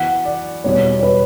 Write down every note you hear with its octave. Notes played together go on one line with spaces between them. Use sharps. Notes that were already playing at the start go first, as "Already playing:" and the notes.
Already playing: E3 B3 F#4 F#5
D5
E2 B2 G3 C#5
C#5
B4